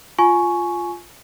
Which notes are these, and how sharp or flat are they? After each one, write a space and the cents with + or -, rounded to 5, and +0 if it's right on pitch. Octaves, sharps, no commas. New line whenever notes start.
F4 +0 G#5 +20 C#6 +0